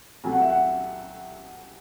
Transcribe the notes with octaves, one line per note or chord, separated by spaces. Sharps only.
C2 C3 F#3 A3 G#5
F#5
E5
F#5